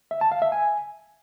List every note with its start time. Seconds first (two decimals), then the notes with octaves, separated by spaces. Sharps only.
0.11 E5
0.21 A5
0.32 F5
0.42 E5
0.52 G#5